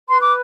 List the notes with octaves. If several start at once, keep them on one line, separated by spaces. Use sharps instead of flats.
B4 C6
D6